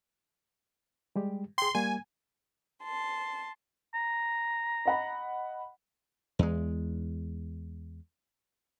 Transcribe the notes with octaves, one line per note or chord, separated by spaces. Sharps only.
G3 G#3 G4
G#4 G5 C6
G3 A#3 G#5
A5 C6
A#5
D#5 F#5 B5
E2 G#3